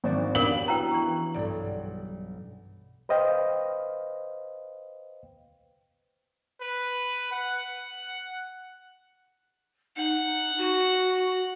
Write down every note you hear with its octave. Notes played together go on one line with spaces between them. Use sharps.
G#1 F3 D4 F#4
B3 C#4 D4 F#4 G4 A#4 F5 F#7
E4 F#4 B4 G5 A#5
E3 C#6
B1 G2 A4 D5
B4 C5 D#5 F5 G5
B4
F#5
D#4 F#5
F#4